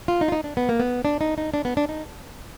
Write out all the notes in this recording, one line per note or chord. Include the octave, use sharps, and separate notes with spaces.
F4
D#4
F4
D#4
D4
B3
A#3
B3
D4
D#4
D#4
D4
B3
D4
D#4